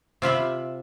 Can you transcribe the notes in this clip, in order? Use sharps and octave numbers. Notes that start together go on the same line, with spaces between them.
C3 F4 E5 B5